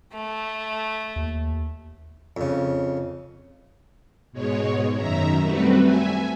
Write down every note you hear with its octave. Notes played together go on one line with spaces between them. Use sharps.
A3
D#2
F2 C#3
G#2 B2 G#3 C#5
F#2 D#3 E5 A#5
G3 A3 C4 F#4 B4
E5 G#5